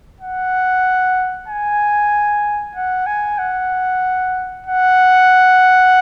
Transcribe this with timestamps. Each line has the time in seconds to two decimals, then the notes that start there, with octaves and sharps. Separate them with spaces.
0.20 F#5
1.48 G#5
2.75 F#5
3.06 G#5
3.38 F#5
4.66 F#5